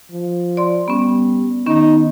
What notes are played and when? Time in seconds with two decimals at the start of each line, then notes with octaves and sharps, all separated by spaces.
0.12 F3
0.57 D5 C6
0.88 G3 B3 C#4
1.67 D#3 B3 C#4 D#4